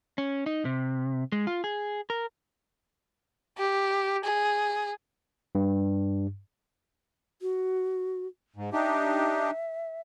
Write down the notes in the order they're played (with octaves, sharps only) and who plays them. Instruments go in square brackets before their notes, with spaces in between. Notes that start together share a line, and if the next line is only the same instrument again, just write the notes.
[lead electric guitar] C#4
D#4
C3
G#3
F4
G#4
A#4
[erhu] G4
G#4
[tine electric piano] G2
[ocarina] F#4
[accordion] G#2
[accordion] D4 D#4 G4 [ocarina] E5